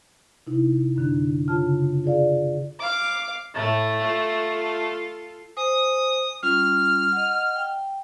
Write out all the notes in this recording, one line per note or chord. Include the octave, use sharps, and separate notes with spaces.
C3 D#4 E4
F#2 D3 D4
C#3 F4 A5 F6
F4 G#4 D5 F5
F5 D6
A2 A3 E4
F4 A4
C5 G#5 D#6
G3 C#4 F4 F6
D#5 F#5
G5